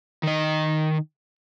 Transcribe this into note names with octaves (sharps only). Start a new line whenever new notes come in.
D#3 D#5